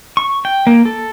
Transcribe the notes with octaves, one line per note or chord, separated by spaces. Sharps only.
C#6
G5
A#3
A4